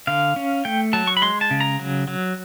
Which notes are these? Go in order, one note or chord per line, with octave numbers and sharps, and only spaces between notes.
D3 F5
C#4
A3 G5
F#3 A5
C#6
B5
G#3 C6
A5
C#3
A#5
F#3
F#3